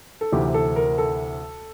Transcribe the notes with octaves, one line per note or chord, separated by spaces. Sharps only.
A4
D2 C3 E3 G4
A4
A#4
A4